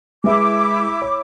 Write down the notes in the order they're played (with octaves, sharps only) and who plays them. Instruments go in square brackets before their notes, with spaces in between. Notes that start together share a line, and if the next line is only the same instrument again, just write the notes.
[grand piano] G#3 B4 E5 [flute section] E4 D6
[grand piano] C#5